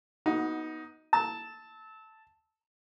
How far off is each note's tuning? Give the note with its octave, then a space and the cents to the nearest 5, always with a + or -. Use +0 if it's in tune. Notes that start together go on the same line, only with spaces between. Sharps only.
B3 -20 D#4 +15 F#4 +0
A5 +0 E6 -25